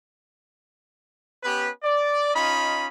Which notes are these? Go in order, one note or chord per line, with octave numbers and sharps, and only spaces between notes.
B3 C#4 G4 B4
D5
C#4 D#4 F4 D#5 B5